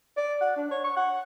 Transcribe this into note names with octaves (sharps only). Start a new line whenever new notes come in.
D5
F#5
D4
C#5
C#6
F#5